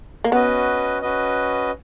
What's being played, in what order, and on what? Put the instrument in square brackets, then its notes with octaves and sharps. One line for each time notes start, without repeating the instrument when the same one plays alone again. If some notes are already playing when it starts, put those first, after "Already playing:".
[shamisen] A#3
[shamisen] B3 [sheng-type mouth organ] C#4 F#4 B4 D#5
[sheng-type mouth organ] C#4 F#4 B4 D#5